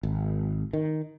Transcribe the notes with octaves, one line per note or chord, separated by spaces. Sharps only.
G#1
D#3